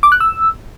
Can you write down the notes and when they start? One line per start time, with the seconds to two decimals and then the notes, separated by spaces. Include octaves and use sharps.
0.03 D6
0.12 F#6
0.20 E6